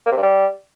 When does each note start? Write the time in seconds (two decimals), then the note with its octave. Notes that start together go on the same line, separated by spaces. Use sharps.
0.06 A#3
0.11 C3
0.17 G2
0.23 G3